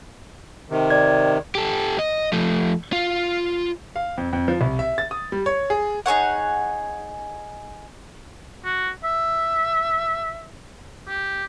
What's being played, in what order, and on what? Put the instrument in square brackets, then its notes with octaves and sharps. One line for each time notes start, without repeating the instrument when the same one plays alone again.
[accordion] C3 D#3
[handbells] D5 G#6
[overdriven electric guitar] G4 A4
D#5
F3 A3
F4
[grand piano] F5
F2
F2
F3
C2
E5
A6
D#6
G3
C#5
G#4
[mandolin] D#4 G#4 C#5 F#5
[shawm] F#4
E5
G4